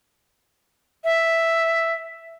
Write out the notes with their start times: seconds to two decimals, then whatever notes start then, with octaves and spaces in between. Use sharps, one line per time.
1.04 E5